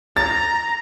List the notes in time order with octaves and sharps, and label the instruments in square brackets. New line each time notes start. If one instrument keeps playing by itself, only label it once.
[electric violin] A#5 [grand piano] A6